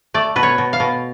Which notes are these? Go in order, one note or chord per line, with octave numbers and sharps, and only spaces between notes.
A3 D5
B2 B4
C#5
B2
F5
B2